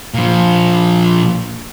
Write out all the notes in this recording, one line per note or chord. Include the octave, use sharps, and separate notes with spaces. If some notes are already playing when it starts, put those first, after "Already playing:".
A#2 F3